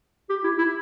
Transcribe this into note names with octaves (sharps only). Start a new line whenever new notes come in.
G4
E4
E4